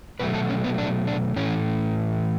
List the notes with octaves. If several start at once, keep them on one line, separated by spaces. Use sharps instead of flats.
B2 F#3 A3 B4
A4
C#4
B3
D4
D4
A2 E3 A3 C#4